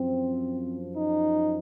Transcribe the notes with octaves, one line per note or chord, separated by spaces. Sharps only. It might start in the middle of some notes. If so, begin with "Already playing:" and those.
Already playing: F#2 F3 C4
D#4